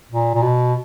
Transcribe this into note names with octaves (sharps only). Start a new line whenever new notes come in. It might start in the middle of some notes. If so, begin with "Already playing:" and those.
A#2
A#2
B2